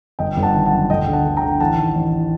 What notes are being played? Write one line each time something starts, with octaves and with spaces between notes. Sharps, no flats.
G1 D#5 G5
G1
F#5 A5
D#3
F#5 A5
F#2
D2 D#5 G5
D3
F#5 A5
D3
G5 A#5
D3
A1 F#5 A5
D#3
A1